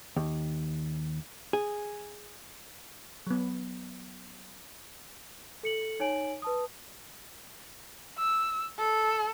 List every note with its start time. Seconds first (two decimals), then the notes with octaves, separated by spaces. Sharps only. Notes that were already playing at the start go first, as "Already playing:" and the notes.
0.16 D#2
1.53 G#4
3.27 F#3 B3
5.63 A4 C#7 F#7
6.00 D#4 C#5 G#5 D7 F#7
6.42 B4 A5 D#6
8.18 E6
8.79 A4